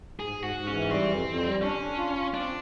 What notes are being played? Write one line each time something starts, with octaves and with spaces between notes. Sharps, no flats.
G#2 G#4
G#2
F#4
G#2
C#4
E3
G3 C4
F2
F2
G3
C#4 D4
D4
F4
F4
C4 D4